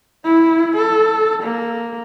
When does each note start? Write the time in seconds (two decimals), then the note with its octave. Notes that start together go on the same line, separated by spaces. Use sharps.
0.24 E4
0.77 A4
1.43 A#3